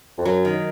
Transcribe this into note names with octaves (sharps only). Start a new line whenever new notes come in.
F2
F#2 F#3
D#3